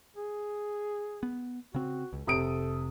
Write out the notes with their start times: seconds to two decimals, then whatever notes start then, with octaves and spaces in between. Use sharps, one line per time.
0.17 G#4
1.23 B3
1.74 C#3 C4 F#4
2.13 C#2
2.27 F1 C3 A4 D#6 D7